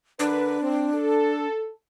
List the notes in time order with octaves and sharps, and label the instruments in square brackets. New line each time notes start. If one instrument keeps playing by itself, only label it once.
[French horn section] D3 A#4 B4 [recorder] D4
[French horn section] C4
A4